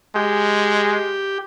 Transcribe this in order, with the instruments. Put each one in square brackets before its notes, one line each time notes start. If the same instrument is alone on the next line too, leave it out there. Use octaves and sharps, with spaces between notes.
[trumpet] G#3 [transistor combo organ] G4